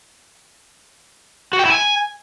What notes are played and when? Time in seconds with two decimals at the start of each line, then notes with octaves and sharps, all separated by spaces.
1.53 F#4
1.59 G5
1.65 E4
1.72 G#5